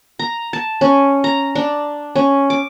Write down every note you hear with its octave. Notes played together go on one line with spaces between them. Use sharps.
A#5
A5
C#4
A#5
D4
C#4
D6